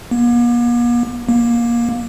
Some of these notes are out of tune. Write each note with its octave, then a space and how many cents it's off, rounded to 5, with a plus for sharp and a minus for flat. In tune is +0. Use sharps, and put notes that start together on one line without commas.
A#3 +45
A#3 +20